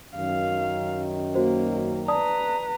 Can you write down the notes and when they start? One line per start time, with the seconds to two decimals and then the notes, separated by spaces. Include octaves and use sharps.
0.16 F#2 D#3 F5
1.35 A#3 F#4 C5
2.08 B4 D5 A5 A#5 D#6